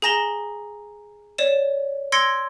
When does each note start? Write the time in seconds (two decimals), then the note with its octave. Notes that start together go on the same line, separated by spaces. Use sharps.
0.02 G#4 G#5 A#5 A#6 E7 G7
1.38 C#5 D5 E7
2.12 C6 E6 G#6 A#6 C#7 D7